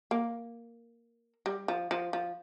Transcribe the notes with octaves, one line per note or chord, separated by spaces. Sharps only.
A#3
G3
F3
F3
F3